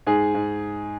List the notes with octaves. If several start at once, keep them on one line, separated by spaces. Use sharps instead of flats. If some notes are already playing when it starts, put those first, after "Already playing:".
G#2 G#4
G#2